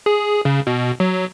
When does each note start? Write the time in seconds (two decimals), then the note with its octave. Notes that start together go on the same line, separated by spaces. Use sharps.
0.06 G#4
0.45 C#3
0.67 B2
1.00 F#3